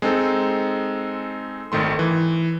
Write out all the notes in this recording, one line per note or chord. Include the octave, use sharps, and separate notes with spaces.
G#3 C4 D#4 A4
G#1 D#3 A3 C6
E3